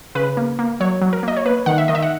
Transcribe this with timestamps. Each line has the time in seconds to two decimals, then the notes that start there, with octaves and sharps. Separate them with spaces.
0.15 C#3 B4
0.37 A#3
0.59 A#3
0.80 F#3 C#5
1.01 F#3
1.13 A#4
1.23 A#3 D#5
1.37 C#5
1.45 A#3 B4
1.66 D#3 F#5
1.78 E5
1.88 D#3 D#5
1.95 E5
2.02 F#5